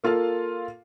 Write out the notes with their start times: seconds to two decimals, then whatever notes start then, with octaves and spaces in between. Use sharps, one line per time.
0.04 A#3 F4 A4 F5